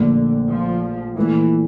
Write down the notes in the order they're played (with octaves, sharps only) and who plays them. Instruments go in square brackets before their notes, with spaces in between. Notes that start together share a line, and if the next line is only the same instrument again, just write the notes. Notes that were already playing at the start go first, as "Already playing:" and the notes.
Already playing: [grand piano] A#1 A#2 A3 [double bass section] D3
[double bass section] F3
[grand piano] A#2 A3 E4 [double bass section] E3